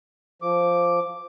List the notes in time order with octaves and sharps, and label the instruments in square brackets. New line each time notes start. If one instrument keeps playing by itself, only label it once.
[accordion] F3 D6